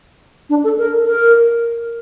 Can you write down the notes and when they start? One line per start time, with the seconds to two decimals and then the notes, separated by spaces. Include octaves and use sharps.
0.50 D4
0.64 A4
0.78 A#4
1.07 A#4